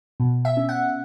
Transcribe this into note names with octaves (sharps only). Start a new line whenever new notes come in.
B2
E5
C#4
F#5